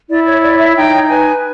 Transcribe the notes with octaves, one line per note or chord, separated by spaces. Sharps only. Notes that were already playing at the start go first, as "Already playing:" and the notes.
E4 D5
C#5
C#5 D5
E5
D#4 G5
B4 G#5